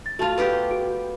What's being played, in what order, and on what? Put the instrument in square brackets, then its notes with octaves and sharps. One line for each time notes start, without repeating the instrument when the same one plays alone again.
[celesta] A6
[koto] A3 F4 [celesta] F#4 A5 F7
[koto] B3 F4 G4
[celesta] F#4 G#4 D7